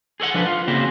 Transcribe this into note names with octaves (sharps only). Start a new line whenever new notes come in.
G#4 A4 C#5 F#5
F3 D4 B4
F4
C#3 A#3 C4 E4 F#4 G#4